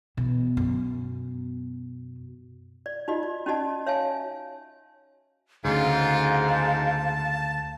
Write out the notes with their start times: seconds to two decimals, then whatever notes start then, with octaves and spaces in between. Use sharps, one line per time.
0.18 B2 E3
0.57 F#2
2.86 D5
3.08 D#4 F4 F#4 D5 D#5
3.23 D5
3.46 C#4 D#4 F#4 D5 D#5 A5
3.86 C#5 E5 F5 G#5 A5
5.65 D2 G#2 C#3 F4 F5
6.48 A5